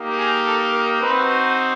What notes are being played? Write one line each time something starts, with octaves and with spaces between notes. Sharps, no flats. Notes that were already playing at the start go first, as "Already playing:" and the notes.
Already playing: A#3 D#4 G4
G#4
A4
A#4
C4 D#4 F#4 B4